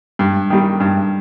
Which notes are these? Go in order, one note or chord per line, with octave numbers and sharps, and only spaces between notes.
G2
D#3 G3
G2